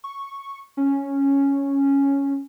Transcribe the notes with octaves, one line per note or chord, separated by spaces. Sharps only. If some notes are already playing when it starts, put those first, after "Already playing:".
C#6
C#4